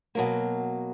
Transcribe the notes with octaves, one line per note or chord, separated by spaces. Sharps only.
B2 F#3 A#3